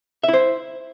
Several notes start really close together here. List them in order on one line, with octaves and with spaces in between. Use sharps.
E5 E4 C5